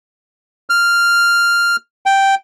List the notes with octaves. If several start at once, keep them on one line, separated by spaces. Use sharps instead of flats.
F6
G5